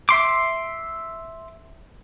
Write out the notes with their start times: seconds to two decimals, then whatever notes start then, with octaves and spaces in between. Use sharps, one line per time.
0.09 E5 C6 D6